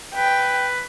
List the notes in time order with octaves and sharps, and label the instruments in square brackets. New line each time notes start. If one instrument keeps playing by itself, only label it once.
[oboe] B4 [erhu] G5